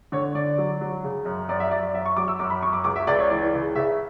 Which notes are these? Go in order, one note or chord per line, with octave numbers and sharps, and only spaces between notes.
D3 C#5
D3 D5
F#3
F#3
C#3
F#2
F#2 D5
E5
F#2 D5
F#2 E5
C#6
F#3 D6
E6
F#2 D6
B5
F#2 C#6
D6
C#2 D6
E5
C#2 D5
C#5
E3 D5
C#3
C#3 E5